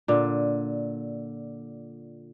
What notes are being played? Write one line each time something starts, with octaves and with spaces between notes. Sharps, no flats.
A#2 D3